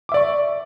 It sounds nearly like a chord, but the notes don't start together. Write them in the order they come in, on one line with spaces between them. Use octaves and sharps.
D6 E5 D5 C#6